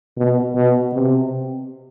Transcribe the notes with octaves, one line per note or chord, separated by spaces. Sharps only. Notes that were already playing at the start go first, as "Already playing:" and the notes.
B2
B2
C3